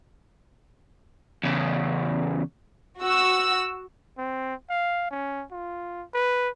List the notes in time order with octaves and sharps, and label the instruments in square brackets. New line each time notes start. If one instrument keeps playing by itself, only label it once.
[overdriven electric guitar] E2 C#3
[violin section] F#4 E6
[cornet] C4
F5
C#4
F4
B4